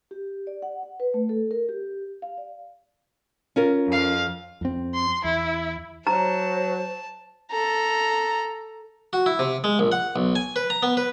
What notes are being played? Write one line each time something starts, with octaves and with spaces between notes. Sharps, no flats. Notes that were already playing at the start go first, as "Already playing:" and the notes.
G4
D5
F#5
F#5
B4
A3
A4
A#4
G4
F5
D5
C#4 F4 A#4
F2 F5
F2 C4
C6
E2 E4
F#3 C5 A5 A#5
A4 A#5
F#4
E4
C3
G#3
A#1
F#5
B1
G#5
B4
A#5
B3
B4